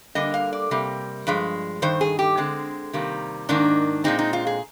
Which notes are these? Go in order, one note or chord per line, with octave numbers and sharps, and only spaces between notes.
D3 G3 A#3 D#5
F5
D5
C3 G3 A#3
G2 F3 G#3
G2 D#3 C5
G#4
G4
D3 G#3 C4
C3 D#3 G3 A#3
G#2 D#3 A#3 D4
A#2 G#3 C4 D#4
D#4
F4
G#4